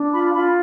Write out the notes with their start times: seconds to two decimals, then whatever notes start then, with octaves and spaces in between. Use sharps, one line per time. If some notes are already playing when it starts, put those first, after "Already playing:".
Already playing: D4
0.13 F4 B5
0.34 F4 B5